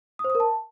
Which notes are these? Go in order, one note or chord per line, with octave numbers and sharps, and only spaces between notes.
D#6
C5
D#6
A#4
A5